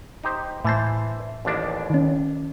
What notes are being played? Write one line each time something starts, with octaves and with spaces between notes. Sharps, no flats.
D#4 G4 C5
A2 E3 C5 A5
A1 D#2 D4
D#3 C#4